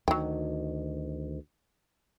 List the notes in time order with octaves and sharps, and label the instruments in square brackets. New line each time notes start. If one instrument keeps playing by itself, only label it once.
[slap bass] D2 D#3 [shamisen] F#3 G5